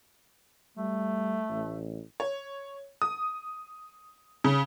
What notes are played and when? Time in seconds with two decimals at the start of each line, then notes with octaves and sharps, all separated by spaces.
0.77 G3 A3
1.49 A1
2.20 C#5
3.02 D#6
4.44 C#3